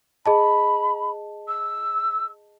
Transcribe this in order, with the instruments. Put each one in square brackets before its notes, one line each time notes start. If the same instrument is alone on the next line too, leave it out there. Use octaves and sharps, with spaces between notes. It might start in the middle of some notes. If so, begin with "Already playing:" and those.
[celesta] G#4 D#5 A5 [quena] B5
[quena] E6